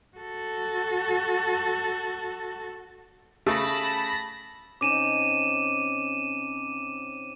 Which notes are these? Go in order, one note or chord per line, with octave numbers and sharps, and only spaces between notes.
F#4 A4
C#3 A3 A5 B5 A#6
C3 C#4 D#4 D6 D#7 E7